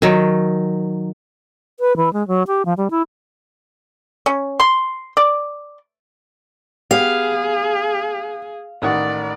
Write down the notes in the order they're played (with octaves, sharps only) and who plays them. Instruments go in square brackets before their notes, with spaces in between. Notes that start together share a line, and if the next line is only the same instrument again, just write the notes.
[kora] D#3 F#3
[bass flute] B4
E3
G#3
F#3
G4
F3
G3
E4
[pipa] C#4
C6
D5
[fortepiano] B3 G4 [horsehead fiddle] G#4 [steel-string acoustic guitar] F5
[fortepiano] A1 D#3 F#5 [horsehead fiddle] D5